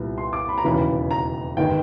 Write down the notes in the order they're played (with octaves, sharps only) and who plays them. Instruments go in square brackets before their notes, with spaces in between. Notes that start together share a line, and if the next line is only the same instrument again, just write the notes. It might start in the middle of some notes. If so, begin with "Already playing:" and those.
Already playing: [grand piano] C2 A#2 G3 B3
C6
D6
B5
A#5
E1 D#2 C#3 E3 B5
A#5
G1 D#3 G#3 B3 G5